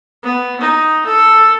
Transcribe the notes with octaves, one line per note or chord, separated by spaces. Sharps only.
B3
D#4
A4